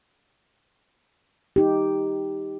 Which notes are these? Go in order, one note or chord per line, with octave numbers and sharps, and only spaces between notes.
D#4 G4